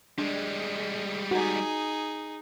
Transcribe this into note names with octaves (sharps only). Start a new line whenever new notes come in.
G3 G#3 D4
D#4 F#4 G#4